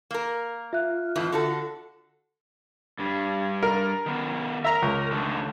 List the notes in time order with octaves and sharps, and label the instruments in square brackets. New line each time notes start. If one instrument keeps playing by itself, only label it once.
[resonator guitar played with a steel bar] A#3 A#4
[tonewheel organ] F4 [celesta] E5 F#6
[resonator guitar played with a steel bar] F2 A2 E3
D3 F#4 A4
[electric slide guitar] G2 G3
[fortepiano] A#4
[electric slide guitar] D#3 B3
[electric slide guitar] A#4 [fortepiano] E5 A#5
[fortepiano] C#2
[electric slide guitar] D3 D#3 A3